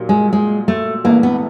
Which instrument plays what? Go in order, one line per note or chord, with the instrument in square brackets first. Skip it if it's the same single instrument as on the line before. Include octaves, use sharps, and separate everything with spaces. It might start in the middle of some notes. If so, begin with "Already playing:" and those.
Already playing: [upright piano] A#2 F#3 A#3 D#4 G4
[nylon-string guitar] G#3
G#3
A3
[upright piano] A#1 G#2 E3 A3 [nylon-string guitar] A#3
[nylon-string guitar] B3